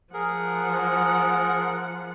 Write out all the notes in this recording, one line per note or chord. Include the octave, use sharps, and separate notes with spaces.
F3 G#4 A#4 F#5